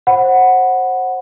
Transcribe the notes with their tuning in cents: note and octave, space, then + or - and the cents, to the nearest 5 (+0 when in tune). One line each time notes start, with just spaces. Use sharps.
C5 +25 F#5 +0 B5 +0